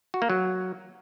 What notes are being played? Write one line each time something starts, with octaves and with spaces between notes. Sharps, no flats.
F#4
A#3
F#3